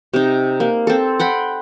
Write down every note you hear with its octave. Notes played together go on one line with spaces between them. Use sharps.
C3 D#4
A#3
C4 A4
F#5 G5 B5 C6